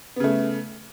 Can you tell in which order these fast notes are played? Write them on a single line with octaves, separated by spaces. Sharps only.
B3 C#3 A3